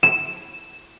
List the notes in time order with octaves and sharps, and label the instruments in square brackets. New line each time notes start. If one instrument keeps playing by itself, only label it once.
[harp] E7